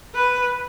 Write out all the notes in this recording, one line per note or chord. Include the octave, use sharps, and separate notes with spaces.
B4